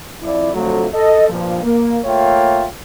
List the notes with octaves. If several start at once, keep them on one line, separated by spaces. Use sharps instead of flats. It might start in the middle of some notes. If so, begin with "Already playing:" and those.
F2 E4 D5
F2 D3 F3 F#3 A3
A4 D#5
G2 A#2 F3
A#3
A3 A#3 F4 C#5 E5 G5